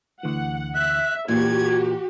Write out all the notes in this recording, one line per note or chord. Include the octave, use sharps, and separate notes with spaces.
D2 D3 E3 F#5
E5 F#6
A#2 E3 F#4 G4 G#6